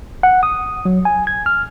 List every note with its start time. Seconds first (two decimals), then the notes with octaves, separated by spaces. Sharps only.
0.23 F#5
0.43 D#6
0.85 F#3
1.05 G#5
1.27 G#6
1.46 F6